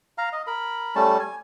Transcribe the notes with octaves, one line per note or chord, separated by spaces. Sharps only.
F5 A#5
D#5
A#4 B5
G3 A3 C#4 A5
G#5